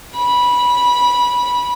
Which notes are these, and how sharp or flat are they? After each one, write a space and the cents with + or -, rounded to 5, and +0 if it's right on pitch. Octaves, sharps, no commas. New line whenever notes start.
B5 -15